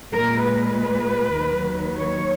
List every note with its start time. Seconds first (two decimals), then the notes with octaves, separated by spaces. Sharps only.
0.12 A#2 G#3 A#4
0.43 B4
1.35 D#2 D#3 F#3
1.97 C#5